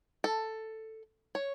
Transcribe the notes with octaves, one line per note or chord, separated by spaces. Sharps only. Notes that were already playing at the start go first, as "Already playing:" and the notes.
A4
C#5